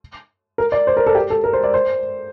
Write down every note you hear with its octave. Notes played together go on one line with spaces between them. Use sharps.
A#4
D5
C5
A#4
A4
G4
A4
A#4
C5
D5
C5